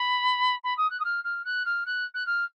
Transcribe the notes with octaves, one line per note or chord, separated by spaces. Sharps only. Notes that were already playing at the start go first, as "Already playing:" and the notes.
Already playing: B5
B5
D#6
F#6
D#6
F6
F6
F#6
F6
F#6
F#6
F6